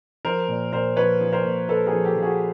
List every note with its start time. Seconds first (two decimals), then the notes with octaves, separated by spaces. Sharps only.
0.25 F3 A#4 C5
0.48 A#2
0.73 A#2 A#4 C5
0.96 F3 B4 C#5
1.21 F3
1.33 A#4 C5
1.45 A#2
1.68 A#2 A4 B4
1.86 G#4 A#4
1.93 F3
2.05 G4 A4
2.16 F3
2.22 F#4 G#4